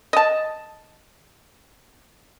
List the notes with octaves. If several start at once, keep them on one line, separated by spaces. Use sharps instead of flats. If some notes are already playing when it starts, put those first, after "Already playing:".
D#5 A5